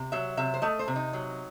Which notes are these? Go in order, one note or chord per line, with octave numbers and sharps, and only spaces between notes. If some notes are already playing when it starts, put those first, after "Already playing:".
Already playing: C3
F#3 E5
C3 E5
C5
A3 D#5
C5
C3
D#4
F#3